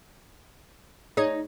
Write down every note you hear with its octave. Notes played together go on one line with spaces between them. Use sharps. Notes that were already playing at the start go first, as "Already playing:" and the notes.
D#4 G#4 C#5